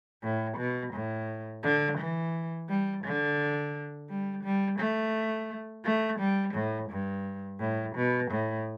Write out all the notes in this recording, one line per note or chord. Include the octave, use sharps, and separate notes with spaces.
A2
B2
A2
D3
E3
G3
D3
G3
G3
A3
A3
G3
A2
G2
A2
B2
A2